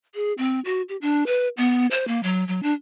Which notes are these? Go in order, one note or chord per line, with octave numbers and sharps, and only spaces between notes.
G#4
C4
F#4
G4
D4
B4
B3
C5
A#3
F#3
F#3
D4